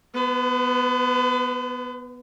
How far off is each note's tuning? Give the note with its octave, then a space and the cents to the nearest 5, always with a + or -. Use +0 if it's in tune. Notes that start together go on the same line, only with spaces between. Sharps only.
B3 +0 B4 +45